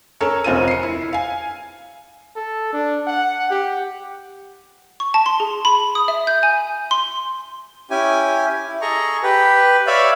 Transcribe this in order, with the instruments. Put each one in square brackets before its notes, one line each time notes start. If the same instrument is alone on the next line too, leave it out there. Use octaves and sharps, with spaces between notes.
[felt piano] C#4 A4 A#4 C#5
F1 C4 C#4 F4 A#4 D#7
C7 C#7
E4
F5 G#5
[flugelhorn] A4
D4
F#5
G4
[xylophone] C#6
A5
C6
G#4
B5
D#6
E5
G6
G#5
C6
[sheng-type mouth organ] C#4 E4 G4 G#5
E4
G#4 A4 D#5 A#5 C#6
G4 B4
C#5 D5 E5 F5 B5